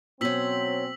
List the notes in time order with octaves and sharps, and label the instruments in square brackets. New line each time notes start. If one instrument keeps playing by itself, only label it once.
[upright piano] B2 [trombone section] F#3 C4 [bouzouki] C#4 C5 [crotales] E6 B6 F#7